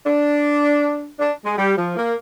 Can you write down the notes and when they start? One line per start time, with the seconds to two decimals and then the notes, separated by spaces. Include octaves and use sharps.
0.05 D4
1.19 D4
1.44 G#3
1.56 G3
1.75 F3
1.96 A#3